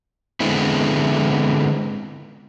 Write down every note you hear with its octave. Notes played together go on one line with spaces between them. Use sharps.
D3 G#3 B3 C4 E4